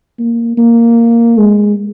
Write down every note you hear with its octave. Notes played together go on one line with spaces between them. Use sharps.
A#3
A#3
G#3